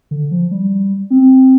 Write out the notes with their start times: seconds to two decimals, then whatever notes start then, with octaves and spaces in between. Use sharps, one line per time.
0.11 D3
0.31 F3
0.51 G3
1.10 C4